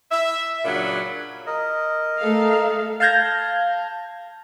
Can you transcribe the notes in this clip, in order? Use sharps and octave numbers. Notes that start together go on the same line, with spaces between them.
E5
A#2 C#3 F#3 D4 B5
A#4 D#5
A3 A4 F5
F5 A5 F6 G6 G#6 A#6